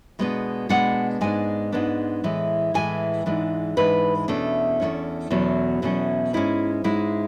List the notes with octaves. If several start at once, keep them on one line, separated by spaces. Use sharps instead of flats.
B2 G#3 B3 D4
B2 G#3 B3 D4 F#5
G#2 G#3 B3 D4 G#5
G#2 G#3 B3 D4
A2 E3 G#3
A2 E3 G#3 G#5
G#2 E3 G#3 D4
G#2 E3 G#3 D4 B4
E2 B2 A3 C#4 D4
E2 B2 A3 C#4
E2 B2 F#3 A3 C#4
E2 B2 F#3 A3 C#4
G#2 G#3 C#4 E4
G#2 G#3 C#4 E4